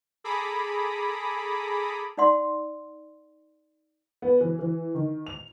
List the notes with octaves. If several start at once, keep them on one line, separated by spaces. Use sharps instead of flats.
G#4 A4 A#5 B5 D6 D#6
D#4 D5 F#5 C6
B3
E3
E3
D#3
F7